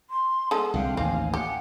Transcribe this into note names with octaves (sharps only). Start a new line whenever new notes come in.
C6
G#3 B3 A4
C2 D3 F5 G5
A1 D#2 C4 G4 F5 G#5
G4 F#5